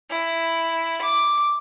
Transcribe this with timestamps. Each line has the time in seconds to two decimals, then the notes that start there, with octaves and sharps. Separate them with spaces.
0.10 E4
1.01 D6